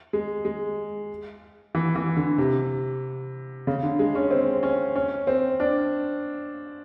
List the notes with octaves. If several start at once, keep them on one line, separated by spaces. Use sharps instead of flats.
G#3
G#3
E3
E3
D3
C3
C#3
D3
G#3
C#4
C4
C#4
C#4
C4
D4